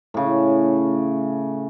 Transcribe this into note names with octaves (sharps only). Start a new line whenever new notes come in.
A2 C#3